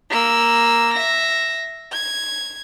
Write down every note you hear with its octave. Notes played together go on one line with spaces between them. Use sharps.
A#3 E6
E5 A#6
G#6